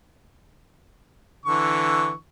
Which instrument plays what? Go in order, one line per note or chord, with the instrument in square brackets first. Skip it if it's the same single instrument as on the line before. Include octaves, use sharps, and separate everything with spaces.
[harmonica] D3 E3 C#6